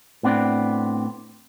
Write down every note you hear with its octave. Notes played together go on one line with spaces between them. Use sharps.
A2 B3 C4 D4